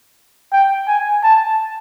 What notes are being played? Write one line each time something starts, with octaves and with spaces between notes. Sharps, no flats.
G5
G#5
A5